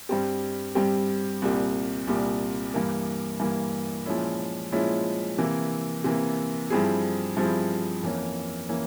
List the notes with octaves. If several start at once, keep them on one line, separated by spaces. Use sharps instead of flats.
G2 G3 C4 G4
G2 G3 C4 G4
C2 A#2 G3
C2 A#2 G3
G2 E3 A#3
G2 E3 A#3
A#2 F3 G#3 C#4 E4
A#2 F3 G#3 C#4 E4
C3 E3 A#3
C3 E3 A#3
G2 F3 C4 E4 G#4
G2 F3 C4 E4 G#4
F2 E3 A#3 C#4
E3 A#3 C#4